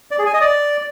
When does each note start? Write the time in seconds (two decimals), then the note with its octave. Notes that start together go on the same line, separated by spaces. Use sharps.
0.11 D5
0.19 G#4
0.26 G#5
0.34 D#5
0.41 D5